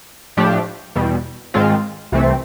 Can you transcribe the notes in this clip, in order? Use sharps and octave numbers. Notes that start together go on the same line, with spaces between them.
A2 F3 A3 D4 G4
E2 B2 G3
G#2 D#3 G#3 C4 F4
C2 C3 E3 A3 C4